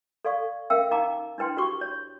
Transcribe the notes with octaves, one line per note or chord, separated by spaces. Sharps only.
A4 D5 F5 C#6
C#4 A#4 E5 F5 G5 E6
D#4 F5 G5 A5 A#5 D6
D4 E4 B4 G5 C6
F#4 G4 C#6 D6
C#5